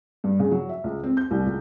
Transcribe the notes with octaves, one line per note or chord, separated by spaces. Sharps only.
G2
C#3
F#3
E5
C#2
C4
G6
C2
C#2